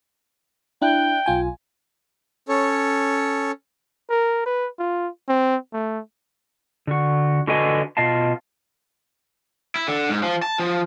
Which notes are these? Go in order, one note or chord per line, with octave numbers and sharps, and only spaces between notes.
D4 E4 G5 F#6
B1 F4 G#5
C#4 A4 C#5
A#4
B4
F4
C4
A3
D3 F#4
D3 F#4 A4 B4 D#5 G#5
B2 F4 D#5 F5 A5
E4
D3
G#2
F3
A5
F3